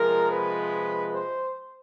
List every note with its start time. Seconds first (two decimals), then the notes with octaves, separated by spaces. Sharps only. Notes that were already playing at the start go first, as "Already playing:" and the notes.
Already playing: C3 F3 G#3 A#4
0.31 B4
1.13 C5